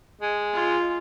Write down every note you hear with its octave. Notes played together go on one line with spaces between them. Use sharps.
G#3
F4